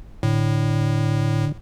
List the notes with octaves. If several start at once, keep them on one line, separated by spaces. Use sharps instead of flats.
A2 D3